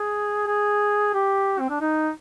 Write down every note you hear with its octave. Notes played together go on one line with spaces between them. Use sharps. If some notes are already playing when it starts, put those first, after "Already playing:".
Already playing: G#4
G#4
G4
C4
D4
D#4